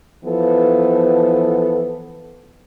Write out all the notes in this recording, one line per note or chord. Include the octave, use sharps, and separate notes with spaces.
E3 F3 B3 A4